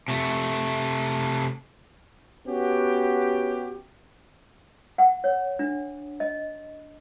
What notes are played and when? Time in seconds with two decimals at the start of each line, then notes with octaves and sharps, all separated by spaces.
0.08 C3 A3
2.47 B3 C#4 F#4 G4
4.98 F#5
5.24 C#5
5.59 D4
6.20 D#5